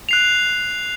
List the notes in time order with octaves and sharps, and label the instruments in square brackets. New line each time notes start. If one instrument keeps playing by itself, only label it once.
[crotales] F#6 C7 F7